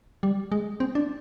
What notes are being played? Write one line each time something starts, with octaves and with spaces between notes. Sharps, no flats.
G3
G#3
C4
D4